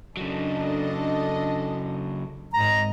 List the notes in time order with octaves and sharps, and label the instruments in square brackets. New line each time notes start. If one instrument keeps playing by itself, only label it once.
[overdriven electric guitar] C#3 F#3 [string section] D4 A4 D#5
[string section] G#1 G#2 D#5 [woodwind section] A#5